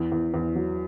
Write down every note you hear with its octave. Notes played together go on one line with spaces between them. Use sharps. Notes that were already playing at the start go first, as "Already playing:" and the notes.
Already playing: E2
E2
E2
F#3